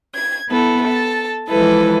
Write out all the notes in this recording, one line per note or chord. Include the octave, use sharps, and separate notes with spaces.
G#6
B3 E4 A4
A4 A5
E3 F3 G#3 E4 A4 B4